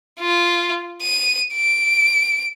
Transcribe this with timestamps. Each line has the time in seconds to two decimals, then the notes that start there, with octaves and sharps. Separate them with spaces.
0.20 F4
1.02 D#7
1.54 D7